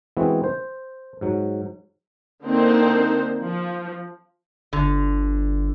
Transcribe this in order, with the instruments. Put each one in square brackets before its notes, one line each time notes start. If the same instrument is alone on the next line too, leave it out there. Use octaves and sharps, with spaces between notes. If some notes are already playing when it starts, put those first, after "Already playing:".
[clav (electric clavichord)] E3 G#3 B3 C4 F#4
C5
G#2 F#3
[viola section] D3 A#3 C4 D#4 C5
F3
[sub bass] G1 [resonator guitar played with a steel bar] D3